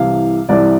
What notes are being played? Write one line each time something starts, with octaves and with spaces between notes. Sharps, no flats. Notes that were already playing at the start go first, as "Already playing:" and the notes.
Already playing: C2 C3 E3 F5
C2 C3 E3 D5